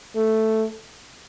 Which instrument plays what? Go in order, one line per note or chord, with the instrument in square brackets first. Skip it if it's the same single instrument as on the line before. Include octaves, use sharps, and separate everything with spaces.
[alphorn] A3